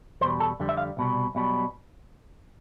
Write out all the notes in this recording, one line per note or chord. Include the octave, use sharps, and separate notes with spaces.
E2 B2 G3 C5
A4
F2 D3 G3
E5
F5
C2 B2 G3
B1 B2 G3